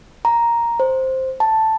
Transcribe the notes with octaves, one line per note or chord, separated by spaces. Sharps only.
A#5
C5
A5